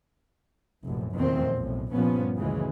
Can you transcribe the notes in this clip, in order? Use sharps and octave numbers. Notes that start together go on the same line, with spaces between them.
F1 A#1 F#2
F1 E2 A#2 D#3 A3 C4
B1 A2
C2 G2 A#2 F3 B3 C#4
D2 C#3 E3 G#3